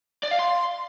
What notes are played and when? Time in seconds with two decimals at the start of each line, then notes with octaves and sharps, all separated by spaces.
0.23 D5
0.31 F5
0.39 C6